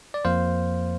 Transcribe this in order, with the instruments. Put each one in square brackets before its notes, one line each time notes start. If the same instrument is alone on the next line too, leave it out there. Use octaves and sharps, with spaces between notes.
[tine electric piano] D5
F2 F3 A#3 C5 F5